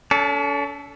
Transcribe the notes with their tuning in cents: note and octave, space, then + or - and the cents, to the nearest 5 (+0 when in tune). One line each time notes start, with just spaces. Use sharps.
C#4 +45 A4 +0